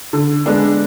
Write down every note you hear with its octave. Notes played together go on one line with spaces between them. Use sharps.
D3
G#3 B3 D4